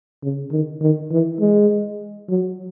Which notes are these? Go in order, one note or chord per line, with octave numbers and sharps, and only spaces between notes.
C#3
D#3
D#3
E3
G#3
F#3